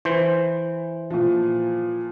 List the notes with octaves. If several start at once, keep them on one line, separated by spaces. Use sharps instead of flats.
E3 C5
A#2 F3